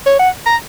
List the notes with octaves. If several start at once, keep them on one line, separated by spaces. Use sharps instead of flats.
C#5
F#5
A#5